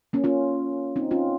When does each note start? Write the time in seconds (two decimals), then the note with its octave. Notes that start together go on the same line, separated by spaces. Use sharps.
0.13 A#3 C#4
0.24 C#4 F4
0.96 C4 D#4
1.11 C#4 F4